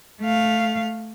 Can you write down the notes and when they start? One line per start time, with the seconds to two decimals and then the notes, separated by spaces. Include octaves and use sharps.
0.21 A3 F5